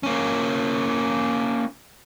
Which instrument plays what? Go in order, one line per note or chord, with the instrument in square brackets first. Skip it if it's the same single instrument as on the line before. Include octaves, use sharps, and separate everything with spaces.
[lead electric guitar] A#3 C#4